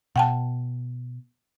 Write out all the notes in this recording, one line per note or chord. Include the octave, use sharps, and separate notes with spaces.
B2 F#5 G5 A5